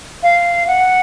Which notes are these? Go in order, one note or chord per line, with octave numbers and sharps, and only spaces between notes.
F5
F#5